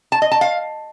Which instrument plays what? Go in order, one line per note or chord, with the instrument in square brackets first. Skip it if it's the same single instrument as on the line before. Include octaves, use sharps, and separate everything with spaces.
[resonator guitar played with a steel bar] A5
D#5
A5
F5